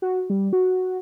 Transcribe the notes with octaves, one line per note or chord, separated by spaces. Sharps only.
F#4
G3
F#4